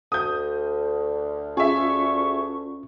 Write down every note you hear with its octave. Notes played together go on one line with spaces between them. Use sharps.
D2 D#6 G6
C#4 F4 G#4 E5 C#6